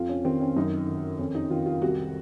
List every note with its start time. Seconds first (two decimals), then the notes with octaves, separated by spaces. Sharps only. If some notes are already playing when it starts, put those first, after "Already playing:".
Already playing: F2 F4
0.09 C#4
0.25 D#3 C4
0.41 C#4
0.56 F#2 D#4
0.87 D#3
1.19 F2 C#4
1.35 D#4
1.50 D#3 F4
1.66 F4
1.82 C2 F#4